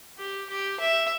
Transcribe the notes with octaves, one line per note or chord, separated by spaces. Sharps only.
G4
G4
E5